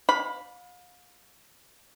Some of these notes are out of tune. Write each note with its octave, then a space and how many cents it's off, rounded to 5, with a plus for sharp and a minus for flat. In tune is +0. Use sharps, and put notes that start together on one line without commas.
F5 +40 B5 +0